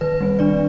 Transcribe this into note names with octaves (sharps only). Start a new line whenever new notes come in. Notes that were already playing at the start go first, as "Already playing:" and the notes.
D#3 B4
G3 C4
D#3 D4 D5